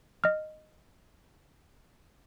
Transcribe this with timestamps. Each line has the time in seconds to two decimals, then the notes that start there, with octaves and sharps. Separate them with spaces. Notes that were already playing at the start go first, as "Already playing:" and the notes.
0.24 D#5 F6